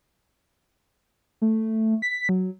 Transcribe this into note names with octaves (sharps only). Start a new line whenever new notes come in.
A3
B6
F#3